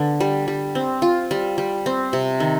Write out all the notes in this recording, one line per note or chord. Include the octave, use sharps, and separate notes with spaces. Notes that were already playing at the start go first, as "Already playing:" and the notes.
Already playing: D3 B3 D4
G3
G3
C4
F4
G3
G3
C4
C3
D#3